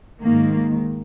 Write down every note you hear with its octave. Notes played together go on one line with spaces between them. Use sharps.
G#2 D#3 A#3